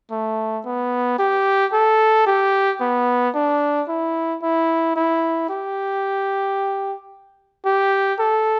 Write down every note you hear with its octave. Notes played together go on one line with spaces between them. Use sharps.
A3
B3
G4
A4
G4
B3
D4
E4
E4
E4
G4
G4
A4